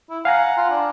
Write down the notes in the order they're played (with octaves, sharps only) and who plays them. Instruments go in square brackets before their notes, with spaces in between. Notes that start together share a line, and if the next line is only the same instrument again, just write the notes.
[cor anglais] E4
[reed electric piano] F5 G#5 A#5 [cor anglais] F#5
[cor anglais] F4
D4